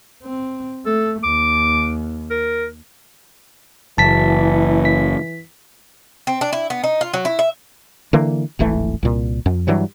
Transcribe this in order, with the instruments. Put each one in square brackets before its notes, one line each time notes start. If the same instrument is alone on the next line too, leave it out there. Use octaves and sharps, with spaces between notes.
[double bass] C4
[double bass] A3 [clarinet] A4
[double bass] D#2 [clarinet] D6
[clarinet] A#4
[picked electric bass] F#1 [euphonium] E3 [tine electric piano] A5 B6
[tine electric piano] B6
[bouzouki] C4
D4
E4
B3
D#4
F4
F#3
E4
E5
[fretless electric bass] D3 E3 A#3
D1 G#1 E3 A3
C2 A#2
F2
G2 E3 F#3 G3